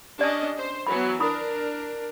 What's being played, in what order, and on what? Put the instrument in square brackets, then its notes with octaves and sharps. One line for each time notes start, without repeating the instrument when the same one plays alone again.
[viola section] C#4 D4 D#5 [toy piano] G4 D5
[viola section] C5
[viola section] E3 F#3 B3 [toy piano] B5
[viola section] D4 A#4 [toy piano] E4 B5 D#6